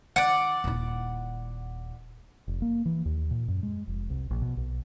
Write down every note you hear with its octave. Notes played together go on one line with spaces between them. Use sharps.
D#3 D5 F#5
D#1 E4
F1
A#3
E3
D#2
A#2
F#2
G#3
F1
C2
A#1
B2
B1